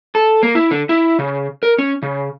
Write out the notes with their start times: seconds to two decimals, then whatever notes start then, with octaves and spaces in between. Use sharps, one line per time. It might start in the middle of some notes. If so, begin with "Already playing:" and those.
0.15 A4
0.43 A#3
0.55 E4
0.71 D3
0.89 E4
1.19 C#3
1.63 A#4
1.78 C#4
2.03 C#3